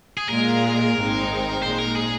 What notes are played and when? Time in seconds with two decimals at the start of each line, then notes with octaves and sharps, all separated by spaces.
0.18 G#4
0.29 A#2 G#3 F4 G#4 A#4
0.96 G#1 G#2 G#3 C4 D#4
1.62 A#2 G#3 D#4 C5
1.79 A#4
1.95 G#4